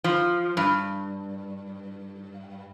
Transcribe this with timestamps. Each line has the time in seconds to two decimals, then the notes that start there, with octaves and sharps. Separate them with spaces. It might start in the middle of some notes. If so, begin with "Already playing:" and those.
0.04 F3
0.57 G2